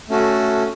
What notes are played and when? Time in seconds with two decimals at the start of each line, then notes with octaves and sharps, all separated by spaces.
0.09 A3 C#4 F#4 A4